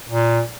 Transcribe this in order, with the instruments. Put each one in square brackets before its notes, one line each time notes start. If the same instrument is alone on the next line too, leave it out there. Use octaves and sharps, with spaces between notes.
[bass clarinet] A#2